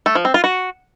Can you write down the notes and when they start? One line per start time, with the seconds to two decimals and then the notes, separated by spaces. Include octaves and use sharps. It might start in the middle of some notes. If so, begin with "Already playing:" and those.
0.06 A3
0.15 F3
0.25 C4
0.34 F4
0.44 F#4